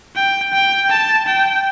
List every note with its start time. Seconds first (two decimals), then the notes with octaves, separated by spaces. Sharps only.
0.15 G5
0.53 G5
0.90 A5
1.27 G5